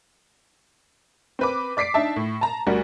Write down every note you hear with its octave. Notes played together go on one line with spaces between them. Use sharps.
C4 B4 D6
D5 D6 B6 C7 D7
D4 D#4 E5 A5
A2
A5 A#5
D2 G3 F#4 A#4